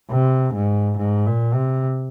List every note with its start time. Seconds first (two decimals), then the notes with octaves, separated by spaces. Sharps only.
0.10 C3
0.54 G#2
0.98 G#2
1.26 A#2
1.54 C3